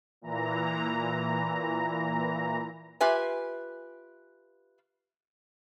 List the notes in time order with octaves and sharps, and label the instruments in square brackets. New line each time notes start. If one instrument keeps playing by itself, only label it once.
[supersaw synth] A#2 E3 A#5
[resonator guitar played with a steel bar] F4 G4 B4 E5 G#5